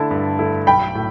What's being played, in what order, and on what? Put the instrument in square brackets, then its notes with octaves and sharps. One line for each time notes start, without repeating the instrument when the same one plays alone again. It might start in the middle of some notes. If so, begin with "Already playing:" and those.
Already playing: [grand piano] D3 A3 E4 [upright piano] A5
[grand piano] G2
D3 A3 E4
[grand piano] B1 [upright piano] G5 B5
[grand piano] A2